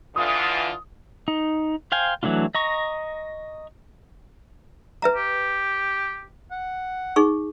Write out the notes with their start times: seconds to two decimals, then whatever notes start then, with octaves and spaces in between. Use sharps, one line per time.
0.16 D3 E3 F4 D#6
1.28 D#4
1.92 C5 F5 G5 G#5
2.23 E3 F#3 A3 D4 F4
2.55 D#5 A#5 C#6
5.02 B4 E5 A#5
5.16 G4
6.51 F#5
7.16 D#4 G#4 C#6